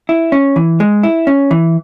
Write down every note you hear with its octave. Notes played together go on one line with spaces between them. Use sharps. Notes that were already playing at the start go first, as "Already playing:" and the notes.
E4
C#4
E3
G#3
E4
C#4
E3